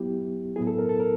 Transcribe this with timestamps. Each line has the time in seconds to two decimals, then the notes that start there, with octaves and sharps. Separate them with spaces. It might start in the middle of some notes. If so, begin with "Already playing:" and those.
Already playing: F#3 B3 E4 G4
0.56 A2 F#3 B3 E4 G#4
0.67 A4
0.79 A#4
0.89 A4
1.00 A#4